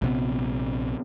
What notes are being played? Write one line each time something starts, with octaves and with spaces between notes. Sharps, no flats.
A#1 C3 B3